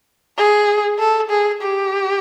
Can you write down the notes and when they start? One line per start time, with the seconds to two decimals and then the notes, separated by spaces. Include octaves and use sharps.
0.38 G#4
0.99 A4
1.30 G#4
1.62 G4